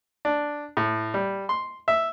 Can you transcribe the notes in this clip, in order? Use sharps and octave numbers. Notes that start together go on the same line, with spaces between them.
D4
A2
G3
C6
E5